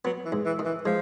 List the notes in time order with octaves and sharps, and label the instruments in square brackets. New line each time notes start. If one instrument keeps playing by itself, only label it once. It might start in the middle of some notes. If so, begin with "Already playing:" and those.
[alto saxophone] F#3 [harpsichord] B3
[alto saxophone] E3
[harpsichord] G#2
[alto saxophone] E3
[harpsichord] D#3
[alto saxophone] E3
[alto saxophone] F3 [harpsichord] G#3